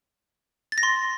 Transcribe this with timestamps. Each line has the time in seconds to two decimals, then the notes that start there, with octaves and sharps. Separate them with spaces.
0.72 A6
0.78 A#6
0.83 C6